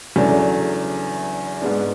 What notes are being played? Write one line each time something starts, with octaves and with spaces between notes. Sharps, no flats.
E2 C#3 F#3 A3 D4
G#2 G#3 B3 D4